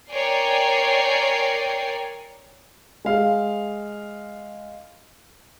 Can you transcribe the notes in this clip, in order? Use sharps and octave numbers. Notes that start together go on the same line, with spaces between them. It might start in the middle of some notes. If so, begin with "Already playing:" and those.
A#4 C#5 D5 G5 G#5 C7
G#3 F5